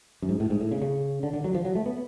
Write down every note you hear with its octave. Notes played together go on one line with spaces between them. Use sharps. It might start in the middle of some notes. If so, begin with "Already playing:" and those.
F#2
G#2
A2
G#2
A2
C#3
C#3
D3
D3
F#3
F3
F#3
A3
B3